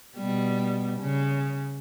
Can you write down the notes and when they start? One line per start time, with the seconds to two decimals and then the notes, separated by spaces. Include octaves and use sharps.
0.17 B2 G3
1.00 C#3